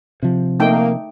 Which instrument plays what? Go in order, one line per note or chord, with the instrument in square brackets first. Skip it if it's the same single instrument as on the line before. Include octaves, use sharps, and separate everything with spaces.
[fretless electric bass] C3 F3
[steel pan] A3 D#4 G5 [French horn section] A#3